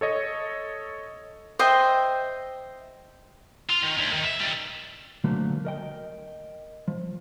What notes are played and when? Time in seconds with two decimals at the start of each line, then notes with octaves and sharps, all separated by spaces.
0.01 A4 C#5 D#5
1.59 C5 D#5 E5 G5
3.70 F4
3.83 D#3
3.98 D2
4.13 D#3
4.25 E5
4.40 D#3 G3
5.24 D2 D3 F3 F#3 A3 A#3
5.65 A#4 D#5 G5
6.88 F3